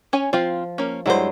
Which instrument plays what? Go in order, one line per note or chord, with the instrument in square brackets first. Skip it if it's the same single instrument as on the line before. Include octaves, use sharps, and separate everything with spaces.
[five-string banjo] C#4 C#5 G#5
[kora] F3 [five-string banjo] C4 F4 F5
[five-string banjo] A#3 C#4
[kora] G2 F#3 G#3 [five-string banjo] E4 C5